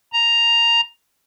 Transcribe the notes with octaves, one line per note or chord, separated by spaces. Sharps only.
A#5